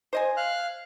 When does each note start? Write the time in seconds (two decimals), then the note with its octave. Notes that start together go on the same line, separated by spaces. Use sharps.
0.13 C5 D#5 G#5
0.37 F5 F6 F#6